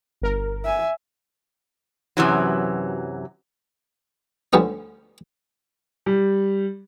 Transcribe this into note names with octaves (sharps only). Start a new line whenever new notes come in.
G1 A#4
E5 G#5
F#2 C3 E3 F#3
D2 D3 F3 G3 B3 C#4
G3